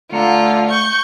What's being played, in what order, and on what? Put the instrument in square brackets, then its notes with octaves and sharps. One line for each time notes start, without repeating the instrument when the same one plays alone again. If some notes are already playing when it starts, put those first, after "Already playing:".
[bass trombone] D3 [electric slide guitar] A3 F#5 A#5 [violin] F4
[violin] C#6 G6